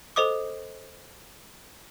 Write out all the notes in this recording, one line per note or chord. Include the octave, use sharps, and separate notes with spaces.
A4 C5 D#5 D6 D#6